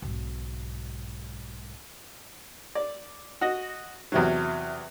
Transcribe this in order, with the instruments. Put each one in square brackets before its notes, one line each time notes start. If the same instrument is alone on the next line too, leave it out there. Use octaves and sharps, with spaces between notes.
[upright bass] B1 G#2
[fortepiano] D5
F#4 D#5
E2 C3 F#3